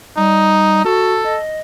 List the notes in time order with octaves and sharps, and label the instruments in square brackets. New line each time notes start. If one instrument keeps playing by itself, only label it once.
[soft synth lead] G3 [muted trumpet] D#4
[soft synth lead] F#4 [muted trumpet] A4
[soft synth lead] D#5